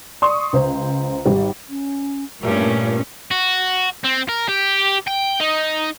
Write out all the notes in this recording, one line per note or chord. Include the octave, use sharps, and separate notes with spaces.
D5 C6 C#6 D#6
C#2 C5
G#1 G3
C#4
G2 A#2 A3 C#4 A#4
F#4
C4
A#4
G4
G5
D#4